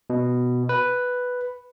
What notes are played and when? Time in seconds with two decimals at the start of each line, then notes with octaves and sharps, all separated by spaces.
0.10 B2
0.69 B4